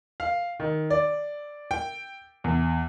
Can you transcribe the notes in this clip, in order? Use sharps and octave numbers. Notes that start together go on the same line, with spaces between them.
F5
D#3
D5
G5
E2